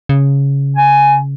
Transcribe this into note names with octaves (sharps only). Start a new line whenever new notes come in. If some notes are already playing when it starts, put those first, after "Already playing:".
C#3
G#5